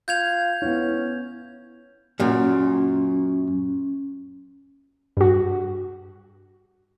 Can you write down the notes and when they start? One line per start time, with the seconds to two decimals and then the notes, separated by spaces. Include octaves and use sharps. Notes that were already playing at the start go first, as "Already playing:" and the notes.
0.08 F4 G6 G#6 F7
0.62 B3 C#4 E4
2.20 F#2 A#2 C#4
5.17 G2 F#4